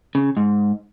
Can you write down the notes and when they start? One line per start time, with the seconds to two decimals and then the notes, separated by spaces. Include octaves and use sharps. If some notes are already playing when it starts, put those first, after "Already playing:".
0.15 C#3
0.37 G#2